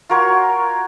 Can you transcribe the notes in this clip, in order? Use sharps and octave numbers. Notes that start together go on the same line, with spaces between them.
F4 F#4 A#4 C#5